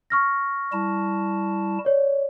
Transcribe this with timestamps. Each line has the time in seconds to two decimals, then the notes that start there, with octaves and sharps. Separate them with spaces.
0.10 C#6 F6 A#6
0.72 G3 E4 A5
1.85 C#5 D5